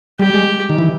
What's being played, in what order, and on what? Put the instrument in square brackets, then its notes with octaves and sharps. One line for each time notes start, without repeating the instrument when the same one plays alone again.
[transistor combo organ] G3 [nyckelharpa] G4
[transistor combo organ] G#3
D#3
E3